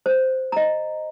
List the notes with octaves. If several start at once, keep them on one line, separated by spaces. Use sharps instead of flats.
C5
D#5 A#5